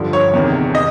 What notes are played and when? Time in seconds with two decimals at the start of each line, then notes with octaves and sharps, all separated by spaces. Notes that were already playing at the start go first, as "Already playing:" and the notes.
Already playing: G2 D3 F3
0.13 C#5
0.33 E2 C3 D#3
0.75 D#5